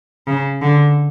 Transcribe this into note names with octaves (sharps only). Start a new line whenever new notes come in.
C#3
D3